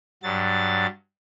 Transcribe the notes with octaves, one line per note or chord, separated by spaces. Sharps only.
G2 F#3 A6